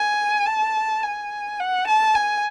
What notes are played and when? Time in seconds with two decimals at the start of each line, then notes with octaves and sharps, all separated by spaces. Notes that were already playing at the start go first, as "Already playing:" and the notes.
Already playing: G#5
0.46 A5
1.03 G#5
1.60 F#5
1.88 A5
2.15 G#5